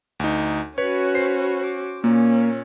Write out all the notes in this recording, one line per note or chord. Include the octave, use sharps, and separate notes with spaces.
D2 D#4
C#4 F#4 B4 C#5
C5 C7
D6
A#2 A#3 C#4